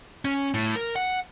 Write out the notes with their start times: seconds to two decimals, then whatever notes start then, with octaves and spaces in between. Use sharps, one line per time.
0.25 C#4
0.54 A2
0.76 A#4
0.96 F#5